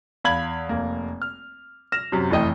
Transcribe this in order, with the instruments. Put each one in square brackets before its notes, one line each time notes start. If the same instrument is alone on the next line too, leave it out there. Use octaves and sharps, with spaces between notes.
[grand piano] E2 F5 B5 G#6 F#7
F1 A#3
F6
F6 A#6 E7
F#2 C3
F1 E3 A3 D#5 G5